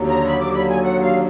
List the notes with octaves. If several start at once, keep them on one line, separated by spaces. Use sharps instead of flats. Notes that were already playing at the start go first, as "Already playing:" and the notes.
Already playing: D#2 D3 F#3
A#5
B5
D6
B5
G#5
F#5
F5